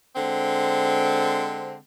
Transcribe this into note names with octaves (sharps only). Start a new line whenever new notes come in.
D3 G#3 C4